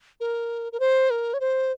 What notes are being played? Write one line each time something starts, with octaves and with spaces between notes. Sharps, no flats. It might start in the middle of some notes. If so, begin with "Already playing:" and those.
A#4
A#4
C5
A#4
C#5
C5